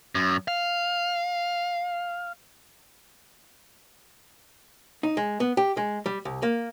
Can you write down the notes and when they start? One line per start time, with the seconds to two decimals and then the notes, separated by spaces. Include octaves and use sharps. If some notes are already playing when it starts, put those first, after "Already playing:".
0.15 F#2
0.48 F5
5.03 D#4
5.17 G#3
5.40 B3
5.57 G4
5.77 G#3
6.06 G3
6.25 C2
6.43 A#3